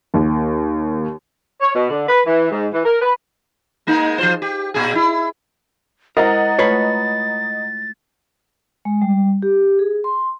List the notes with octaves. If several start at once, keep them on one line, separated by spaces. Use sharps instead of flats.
D#2
C#5
B2
D3
B4
E3
G#2
E3
A#4
B4
G#3 A#3 D#4
F3 F4 C5
G4
A#2 G#4
E4
G#3 E4 A#4 C5 D#5 F#5 A#5 A6
A3 F4 B4 C#5
G#3
G3
G4
G#4
C6